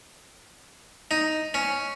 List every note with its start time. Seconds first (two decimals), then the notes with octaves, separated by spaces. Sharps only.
1.11 D#4
1.54 C#4